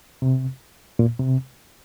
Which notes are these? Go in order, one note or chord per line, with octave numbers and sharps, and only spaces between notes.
C3
A#2
C3